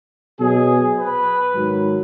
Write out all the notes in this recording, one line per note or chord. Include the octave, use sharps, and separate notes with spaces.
B2 F#3 G#4
B4
G#2 D#3 F#3